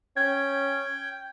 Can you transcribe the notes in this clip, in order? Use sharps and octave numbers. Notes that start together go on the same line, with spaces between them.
C#4 G5 G#6